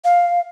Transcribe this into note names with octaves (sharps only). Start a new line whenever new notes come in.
F5